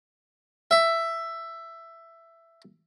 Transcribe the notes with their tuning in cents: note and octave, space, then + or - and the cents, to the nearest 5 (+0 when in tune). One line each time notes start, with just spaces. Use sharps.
E5 +10